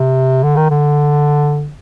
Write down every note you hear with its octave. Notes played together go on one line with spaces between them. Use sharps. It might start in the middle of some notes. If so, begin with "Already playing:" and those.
Already playing: C3
D3
D#3
D3